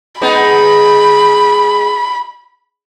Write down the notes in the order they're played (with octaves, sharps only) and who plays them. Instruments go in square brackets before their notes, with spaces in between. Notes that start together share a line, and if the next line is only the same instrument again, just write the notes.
[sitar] G#3 B3 D#4 [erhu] B5